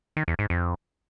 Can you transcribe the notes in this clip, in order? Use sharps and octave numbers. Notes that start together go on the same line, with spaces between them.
D#3
E2
G#2
F2